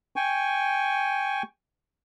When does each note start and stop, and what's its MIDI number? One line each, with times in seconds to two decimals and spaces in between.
0.16 1.43 79
0.16 1.43 80
0.16 1.43 85